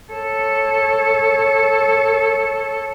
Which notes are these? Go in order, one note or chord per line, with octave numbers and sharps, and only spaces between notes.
A4 C#5